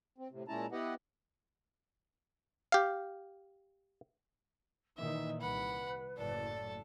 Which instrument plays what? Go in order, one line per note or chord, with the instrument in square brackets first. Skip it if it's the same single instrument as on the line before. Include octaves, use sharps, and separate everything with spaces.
[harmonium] C4
A2 C3
A#2 G#3 C#4 E4 A5 A#5
B3 E4 G4 B4 D#5 F#5
[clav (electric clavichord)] G4 F5
[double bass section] A#2 D#3 E3 [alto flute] D#4 [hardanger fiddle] E5
[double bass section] C2 [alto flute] B4 [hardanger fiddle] F#5 B5
[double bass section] F#1 A2 [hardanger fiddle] A4 A5 [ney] D5